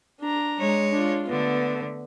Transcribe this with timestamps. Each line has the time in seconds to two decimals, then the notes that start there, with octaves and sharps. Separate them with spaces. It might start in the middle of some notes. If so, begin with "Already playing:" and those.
0.20 D4 A#5
0.58 G#3 C#5
0.92 D4 F4
1.29 D3 A3 B3